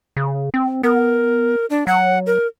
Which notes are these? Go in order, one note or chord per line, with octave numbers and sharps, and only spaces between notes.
C#3
C4
B3 A#4
D4
F#3 F#5
A#4